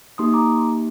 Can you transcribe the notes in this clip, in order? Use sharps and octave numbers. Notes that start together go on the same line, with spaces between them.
A#3 D#4 G4 C6 D#6
A#5 D6